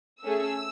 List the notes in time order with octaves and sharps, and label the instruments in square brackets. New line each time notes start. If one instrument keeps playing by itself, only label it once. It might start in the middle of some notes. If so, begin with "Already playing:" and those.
[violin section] A3 C#4 G#4 E6